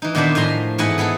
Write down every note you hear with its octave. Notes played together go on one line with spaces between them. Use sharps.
E3 D#4
A#2 D#3 B3 D4 C5 B5
A2 F3 G#5 A#5 C6
G#2 E3 B3 D#5 F#5 G#5
E3 B3 G#4 A4